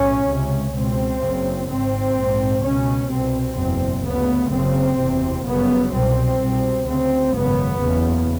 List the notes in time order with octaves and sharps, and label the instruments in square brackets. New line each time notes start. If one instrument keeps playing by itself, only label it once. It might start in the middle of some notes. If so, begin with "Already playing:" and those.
Already playing: [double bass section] B1 A2 C#4
C#2 C3
C#2 B2 C4
F#1 F#2 C#3
G#1 G#2 C4
A#1 G#2
C#2 B2 C#4
C2 B2 C4
F#1 E2 B2 C4
D2 C#3 B3
F#1 F#2 C#3 C4
F#1 E2 C3
G1 F#2 C#3 B3
C2 B2 C4
C2 B2
D2 C#3 C4
G#1 F#2 C#3 B3
F#1 E2 C#3